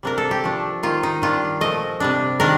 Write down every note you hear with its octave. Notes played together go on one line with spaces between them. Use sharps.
C3 G3 A#3 D4 A#4
A4
G4
F3 A3 D4
D#3 A#3 D#4 F4
D#4
D#3 G3 D4 F4
A#2 F3 A3 D#5
C3 G3 D4
D#3 G3 D4 A#4